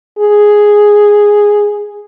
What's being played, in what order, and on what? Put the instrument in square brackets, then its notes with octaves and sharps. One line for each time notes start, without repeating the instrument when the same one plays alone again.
[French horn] G#4